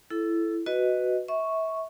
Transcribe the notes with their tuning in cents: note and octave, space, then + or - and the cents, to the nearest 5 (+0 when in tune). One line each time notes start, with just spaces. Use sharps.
E4 +15 A4 -15
F#4 +0 B4 +10 D#5 +0
E5 -30 C#6 +0